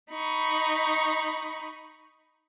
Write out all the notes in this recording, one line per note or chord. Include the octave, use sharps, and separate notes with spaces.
D#4 B5 C#6